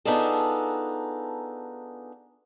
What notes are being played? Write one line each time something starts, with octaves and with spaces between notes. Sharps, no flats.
B3 D4 D#4 F4 G#4 A4